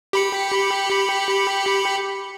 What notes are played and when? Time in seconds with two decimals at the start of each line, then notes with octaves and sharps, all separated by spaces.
0.13 G4 B5 C#7